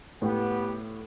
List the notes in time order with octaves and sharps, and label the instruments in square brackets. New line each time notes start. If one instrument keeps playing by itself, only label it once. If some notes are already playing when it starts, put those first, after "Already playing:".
[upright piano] A2 [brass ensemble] B3 G4